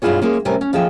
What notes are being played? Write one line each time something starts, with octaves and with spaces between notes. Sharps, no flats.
G2 B2 E4 F4 G#4 C#5
G#3 A#3 C#4
A2 C3 G3 C#4 A#4 G#5
C#4
D#2 F3 G#4 A4 E5 G5